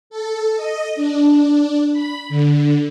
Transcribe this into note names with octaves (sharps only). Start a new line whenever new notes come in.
A4
D#5
D4
B5
D3